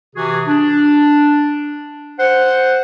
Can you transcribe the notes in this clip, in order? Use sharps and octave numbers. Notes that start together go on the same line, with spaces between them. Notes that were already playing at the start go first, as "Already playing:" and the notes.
C3 E3 F#4 G#4
D4
C5 F#5